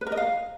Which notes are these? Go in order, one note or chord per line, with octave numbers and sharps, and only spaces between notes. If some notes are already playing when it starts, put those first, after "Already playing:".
B4
A#4
D#5
F5